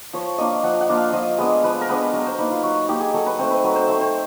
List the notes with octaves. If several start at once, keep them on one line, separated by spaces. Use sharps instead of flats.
F3 C#5
A#3 D4 F4 D#5
F3 F#5
F#5
A#3 D4 F4
F5
F3 D#5
G#3 B3 D4 B4
F3 B4
A#4
G#3 B3 D4 B4
F#3 A#4
C5
A#3 D#4 B4
F4
F#3 F#4
A#3 D#4 G4
G#4
F#3 A4
B4
A3 C4 C5
B4
F#3
C5
A3 C4
C5